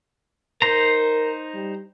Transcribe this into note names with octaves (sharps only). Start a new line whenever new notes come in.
D#4 A#4 C5 A#5
G3